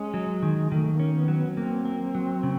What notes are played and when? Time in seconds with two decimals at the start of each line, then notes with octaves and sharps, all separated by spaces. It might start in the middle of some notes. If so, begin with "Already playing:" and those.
Already playing: G#3 C#4
0.14 F#3
0.43 D#3
0.71 D#3 A3
0.93 A#3
0.99 C#4
1.15 B3
1.28 F#3
1.36 B3
1.52 B3
1.57 A#3 C4
1.85 A#3
2.15 F#3
2.43 C#3